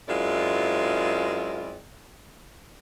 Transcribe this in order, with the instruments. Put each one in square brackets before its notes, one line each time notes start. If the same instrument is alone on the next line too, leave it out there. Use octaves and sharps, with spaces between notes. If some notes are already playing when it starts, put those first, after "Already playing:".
[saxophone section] F#2 G#3 C4 E4 F4 D5